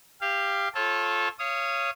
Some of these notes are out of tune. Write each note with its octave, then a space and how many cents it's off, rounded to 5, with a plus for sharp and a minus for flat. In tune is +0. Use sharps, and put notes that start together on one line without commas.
G4 +15 F5 -15
F4 +0 A4 -15 C#5 -30
C#5 +0 F5 -25 D#6 +0